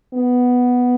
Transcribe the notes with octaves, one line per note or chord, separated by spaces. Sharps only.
B3